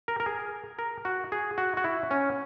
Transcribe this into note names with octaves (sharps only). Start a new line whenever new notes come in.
A#4
A#4
G#4
A#4
F#4
G#4
F#4
F#4
E4
C#4